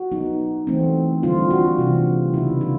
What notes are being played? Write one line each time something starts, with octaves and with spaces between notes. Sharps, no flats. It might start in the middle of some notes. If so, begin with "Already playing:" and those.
Already playing: F#4
F#3 B3 D#4
E3 A3 C4
D3 G3 C4 F4
F#4
C3 E3 A3 D4
C#3 F#3 B3 D#4 E4
F4